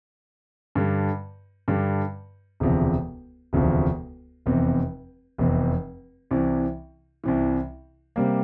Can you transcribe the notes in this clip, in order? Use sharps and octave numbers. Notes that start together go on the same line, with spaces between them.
G2 D3 G3
G2 D3 G3
E1 D2 C3 F3
E1 D2 C3 F3
F1 E2 C3
F1 E2 C3
C2 C3 E3
C2 C3 E3
C3 G3 A#3